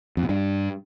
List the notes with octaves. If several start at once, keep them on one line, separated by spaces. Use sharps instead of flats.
F2
B2
G2